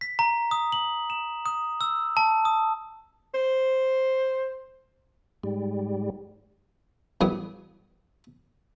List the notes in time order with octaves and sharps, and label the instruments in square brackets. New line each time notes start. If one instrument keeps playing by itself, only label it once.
[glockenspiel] B6
A#5
D#6
F#7
E7
D#6
E6
A5
D#6
[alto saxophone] C5
[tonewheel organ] G#2 G3
[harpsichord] A1 F#2 G3 B3 G#4 D#6